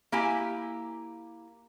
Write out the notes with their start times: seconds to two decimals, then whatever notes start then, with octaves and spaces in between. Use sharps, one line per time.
0.12 A#3 E4 G4 G#5